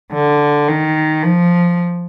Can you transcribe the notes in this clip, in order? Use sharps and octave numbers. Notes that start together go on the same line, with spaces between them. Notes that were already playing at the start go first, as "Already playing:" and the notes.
D3
D#3
F3